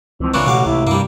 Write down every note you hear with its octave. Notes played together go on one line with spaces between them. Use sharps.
C#2 E3 F3 C4
A#2 C#3 E3 D4 C#5
A1 B2 F5 F#5 D6
C#2 C3 E4
G2 G3 A#3